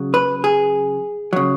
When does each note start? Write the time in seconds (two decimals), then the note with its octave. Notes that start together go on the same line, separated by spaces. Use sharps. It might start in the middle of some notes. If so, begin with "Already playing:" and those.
Already playing: C#3 F#3
0.14 B4
0.44 G#4
1.33 C#3 F#3